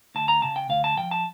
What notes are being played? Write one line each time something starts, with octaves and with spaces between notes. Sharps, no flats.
D2 A5
A#5
C#3 A5
G5
D2 F5
A5
F3 G5
A5